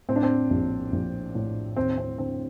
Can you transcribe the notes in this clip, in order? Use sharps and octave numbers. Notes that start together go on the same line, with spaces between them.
A2 C4
D4
C4
A#1
A#1
A2
D#2 C4
C4
D3 C4